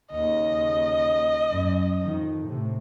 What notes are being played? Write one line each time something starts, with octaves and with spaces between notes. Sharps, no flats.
D#2 C#3 D#5
F#2
F2 D#3
A2 C3